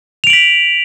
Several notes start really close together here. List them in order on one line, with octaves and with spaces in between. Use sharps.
F7 D7 F#7 B6